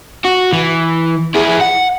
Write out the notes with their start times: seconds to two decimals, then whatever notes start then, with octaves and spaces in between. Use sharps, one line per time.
0.25 F#4
0.53 E3
1.36 E4 G#4
1.61 F#5